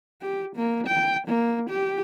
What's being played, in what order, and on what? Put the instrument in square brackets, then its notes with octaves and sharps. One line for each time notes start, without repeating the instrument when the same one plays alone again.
[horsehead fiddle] G4
A#3
G5
A#3
G4